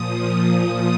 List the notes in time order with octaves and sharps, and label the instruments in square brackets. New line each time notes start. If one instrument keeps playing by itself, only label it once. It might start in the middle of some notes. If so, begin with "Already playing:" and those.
Already playing: [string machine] A#2 F3 D#6